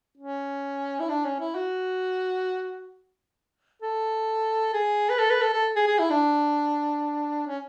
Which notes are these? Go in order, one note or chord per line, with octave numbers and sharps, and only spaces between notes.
C#4
E4
D4
C#4
E4
F#4
A4
G#4
B4
A4
B4
A4
A4
G#4
G#4
E4
D4
C#4